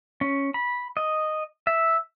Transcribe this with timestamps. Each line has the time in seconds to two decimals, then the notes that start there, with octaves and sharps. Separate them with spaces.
0.21 C#4
0.54 B5
0.97 D#5
1.67 E5